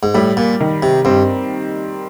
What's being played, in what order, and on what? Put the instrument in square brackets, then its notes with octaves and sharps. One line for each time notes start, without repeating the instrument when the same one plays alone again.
[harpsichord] G#2
[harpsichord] A2 [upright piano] G3
[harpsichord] A#2
[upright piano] D#3
[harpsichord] C3
[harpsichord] G2 [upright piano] C4